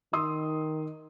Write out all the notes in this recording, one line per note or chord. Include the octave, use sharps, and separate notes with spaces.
D#3 C6 D#6 E6